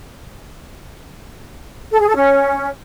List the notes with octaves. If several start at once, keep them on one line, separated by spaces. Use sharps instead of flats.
A4
G#4
A4
C#4